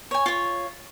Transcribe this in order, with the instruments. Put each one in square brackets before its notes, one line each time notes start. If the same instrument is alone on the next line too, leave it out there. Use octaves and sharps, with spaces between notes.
[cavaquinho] C#5 G#5
F4 C#5